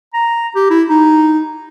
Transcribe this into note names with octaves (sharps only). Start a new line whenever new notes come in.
A#5
G4
E4
D#4